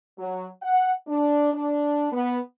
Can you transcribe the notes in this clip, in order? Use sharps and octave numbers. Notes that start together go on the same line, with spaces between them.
F#3
F#5
D4
D4
B3